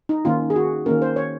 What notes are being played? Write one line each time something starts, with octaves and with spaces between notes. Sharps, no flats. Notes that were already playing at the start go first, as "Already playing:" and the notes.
D#4
D#3 A#3 C#4 F4
G#4
F#4
D#3 A#3 C#4 A#4
C5
C#5